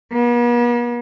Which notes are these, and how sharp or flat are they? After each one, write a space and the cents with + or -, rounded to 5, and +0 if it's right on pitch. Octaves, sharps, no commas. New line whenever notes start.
B3 -45